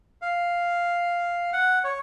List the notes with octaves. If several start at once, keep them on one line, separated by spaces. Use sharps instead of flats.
F5
F#5
C#5